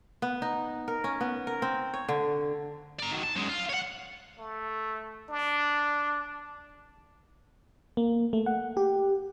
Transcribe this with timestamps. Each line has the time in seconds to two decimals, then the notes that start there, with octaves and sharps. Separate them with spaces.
0.22 B3
0.42 D#4
0.88 A#4
1.04 C#4
1.21 B3
1.47 A#4
1.62 C4
1.94 C#5
2.08 D3
3.00 D5 A#5
3.11 D#3 F#3
3.23 A5
3.36 F#2 G#3
3.49 F4
3.69 C#5 F#5
4.39 A3
5.30 D4
7.97 A#3
8.33 A3
8.46 F#5
8.77 G4